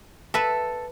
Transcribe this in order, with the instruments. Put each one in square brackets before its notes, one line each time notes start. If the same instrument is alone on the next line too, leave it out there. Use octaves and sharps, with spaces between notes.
[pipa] A4 [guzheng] B4 E5